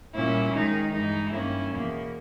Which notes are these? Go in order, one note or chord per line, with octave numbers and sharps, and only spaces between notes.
A#2 G3 C#4 E4
D#3 G#3 D#4
G2 E3 G#3 D#4
G2 D#3 A#3 C#4 E4
E2 B2 A#3